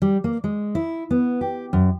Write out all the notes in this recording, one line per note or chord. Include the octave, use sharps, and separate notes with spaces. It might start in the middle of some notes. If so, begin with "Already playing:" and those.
G3
A#3
G#3
E4
B3
G4
F#2